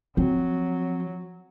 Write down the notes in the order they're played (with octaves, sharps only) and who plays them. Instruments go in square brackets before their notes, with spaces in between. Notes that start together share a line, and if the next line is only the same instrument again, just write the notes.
[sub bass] F3 [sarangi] F#3 [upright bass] C4